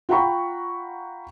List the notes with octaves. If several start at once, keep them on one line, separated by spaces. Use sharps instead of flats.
F4 F#5 G5 A#5 B5 C#6